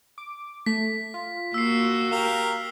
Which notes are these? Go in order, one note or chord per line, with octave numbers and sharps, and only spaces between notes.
D6
A3 B6
F4
A#3 F#4 E6 C7
G4 A#4 F5